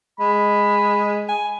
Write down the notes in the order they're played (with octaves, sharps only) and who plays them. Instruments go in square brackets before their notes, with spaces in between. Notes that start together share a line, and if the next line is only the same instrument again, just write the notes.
[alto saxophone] G#3 [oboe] B5
[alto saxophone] G#5